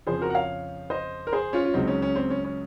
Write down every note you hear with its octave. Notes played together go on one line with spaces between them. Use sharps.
F2 C#3 F3 G#4 C5
F#4 A#4
F#5
C#5 F5
C5 D#5
A#4
G#4 C5
C#4 F4
F4
C#2 C#3 F#3 C4 D#4
C#4
C#4
C4
C#4
C#4